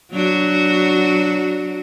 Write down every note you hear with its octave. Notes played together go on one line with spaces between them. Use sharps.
F#3 D4 F#4